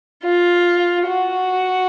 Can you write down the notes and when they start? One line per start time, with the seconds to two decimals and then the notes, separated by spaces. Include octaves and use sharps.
0.24 F4
1.07 F#4